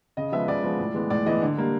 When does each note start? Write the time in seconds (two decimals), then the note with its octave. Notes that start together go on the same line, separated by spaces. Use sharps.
0.17 C#3 D#5
0.32 F3 G#3 B3 E5
0.48 C#3 D5
0.64 F3 G#3 B3
0.79 A2
0.94 E3 G#3 B3
1.10 A2 D5
1.26 E3 G#3 B3 D#5
1.42 D3
1.57 G3 A#3